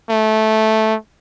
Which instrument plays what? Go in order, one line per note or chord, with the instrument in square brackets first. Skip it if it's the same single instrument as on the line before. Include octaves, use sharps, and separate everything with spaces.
[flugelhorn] A3